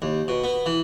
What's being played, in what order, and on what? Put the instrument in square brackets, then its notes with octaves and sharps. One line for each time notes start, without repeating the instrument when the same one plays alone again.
[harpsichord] D#2
B2
B3
E3